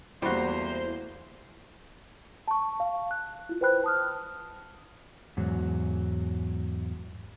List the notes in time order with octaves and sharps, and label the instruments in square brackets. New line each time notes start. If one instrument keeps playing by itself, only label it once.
[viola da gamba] E2 A3 A#3 [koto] G3 F#4 [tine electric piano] E4 [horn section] C5
[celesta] A5 C#6
F5
F#6
E4 F4
B4 C5 G5 B5 F#6
A5 D#6 F6
[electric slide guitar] E2 G#2 F#3